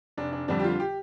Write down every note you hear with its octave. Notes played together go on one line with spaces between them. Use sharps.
F1 D4
D4
F2 D3 G3 D4
G4
F4
G4